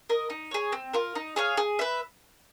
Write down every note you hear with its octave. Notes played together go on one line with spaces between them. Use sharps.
A#4 D#5
D#4
G#4 C#5
C4
F4 A#4
D#4
G#4 C#5 F5
G#4
B4 E5